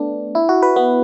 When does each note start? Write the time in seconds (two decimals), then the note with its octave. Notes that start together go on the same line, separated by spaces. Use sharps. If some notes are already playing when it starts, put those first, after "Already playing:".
Already playing: A3 B3 D4
0.35 E4
0.49 F#4
0.62 B4
0.76 B3